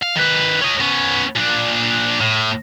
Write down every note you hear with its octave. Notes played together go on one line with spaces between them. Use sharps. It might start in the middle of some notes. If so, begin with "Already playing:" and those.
F5
D#3 B4
C#4 D#5
B3 C#4
A#2 D4
A2